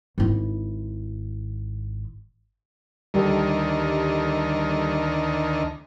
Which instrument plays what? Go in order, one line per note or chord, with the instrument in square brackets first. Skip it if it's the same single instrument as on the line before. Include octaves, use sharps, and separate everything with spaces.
[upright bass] G#1 E4
[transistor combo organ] D2 D#3 [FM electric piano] G3 G4 A4